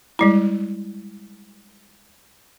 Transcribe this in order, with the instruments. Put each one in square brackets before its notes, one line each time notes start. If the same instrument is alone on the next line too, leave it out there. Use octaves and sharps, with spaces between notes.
[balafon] G3 G#3 E4